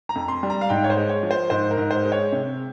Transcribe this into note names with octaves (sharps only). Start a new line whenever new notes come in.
A#5
F2
C6
G3
A#5
F5
G#2 G5
C#5
C5
G#3
C#5
F3
C5
G#2 C5
A#4
G#2
C5
G#3
C#5
C3